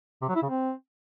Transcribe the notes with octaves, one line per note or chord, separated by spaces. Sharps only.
C3
F#3
E4
C#3
C4